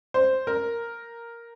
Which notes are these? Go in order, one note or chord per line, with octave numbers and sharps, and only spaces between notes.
C5
A#4